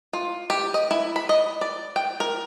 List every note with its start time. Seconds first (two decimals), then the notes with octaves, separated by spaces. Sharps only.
0.13 F4
0.50 G4
0.74 D#5
0.91 E4
1.16 B5
1.29 D#5
1.61 D5
1.96 G5
2.20 A#4